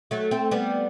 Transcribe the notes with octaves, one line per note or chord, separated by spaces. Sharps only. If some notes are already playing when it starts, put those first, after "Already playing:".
F#3 A3
A3 C4
G3 B3